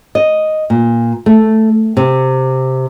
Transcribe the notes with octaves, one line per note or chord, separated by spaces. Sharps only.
D#5
A#2
A3
C3